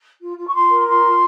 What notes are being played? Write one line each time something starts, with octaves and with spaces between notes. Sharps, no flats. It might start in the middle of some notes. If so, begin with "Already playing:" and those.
F4
F4
C#6
F4 C6
A#4
F4 C6
F4